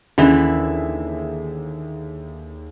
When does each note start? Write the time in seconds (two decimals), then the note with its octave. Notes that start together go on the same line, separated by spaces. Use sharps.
0.18 D#2 D3 E3 C#4 E4 G#4 E5